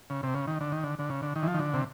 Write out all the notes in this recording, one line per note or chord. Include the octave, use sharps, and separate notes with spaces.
C#3
C3
C#3
D#3
D3
D#3
D3
D3
C#3
D3
D#3
E3
F3
D#3
D3
C3